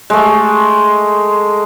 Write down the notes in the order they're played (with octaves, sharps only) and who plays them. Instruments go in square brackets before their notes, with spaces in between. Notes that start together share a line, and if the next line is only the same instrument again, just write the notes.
[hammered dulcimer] G#3 A3